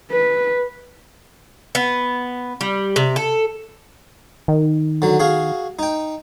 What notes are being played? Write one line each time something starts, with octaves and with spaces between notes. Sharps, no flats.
B4
B3
G3
C3
A4
D#3
D3 F#3
F#4 G#4 F5
D#4 G5